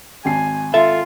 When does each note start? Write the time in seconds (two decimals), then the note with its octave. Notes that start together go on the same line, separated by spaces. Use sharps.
0.25 G#1 G#5 A5 C7
0.74 F4 A4 E5